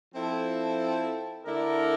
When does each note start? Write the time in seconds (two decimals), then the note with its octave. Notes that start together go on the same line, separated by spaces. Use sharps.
0.14 F3 C4 E4 A4
1.46 D3 A3 E4 A#4 D5